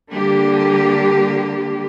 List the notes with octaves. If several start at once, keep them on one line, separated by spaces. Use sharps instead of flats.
D3 G3 A#3 G4